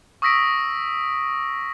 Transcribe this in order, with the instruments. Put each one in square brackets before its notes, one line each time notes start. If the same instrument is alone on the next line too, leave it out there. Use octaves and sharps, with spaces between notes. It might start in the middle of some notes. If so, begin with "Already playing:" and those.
[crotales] C#6 D#6 E6 A#6 B6 D7